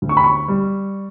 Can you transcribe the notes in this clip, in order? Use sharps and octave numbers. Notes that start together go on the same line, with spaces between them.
D2
C#6
B5
C#6
G3